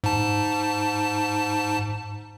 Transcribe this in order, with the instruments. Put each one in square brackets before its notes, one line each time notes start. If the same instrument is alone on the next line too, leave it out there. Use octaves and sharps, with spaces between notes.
[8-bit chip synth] G#2 A5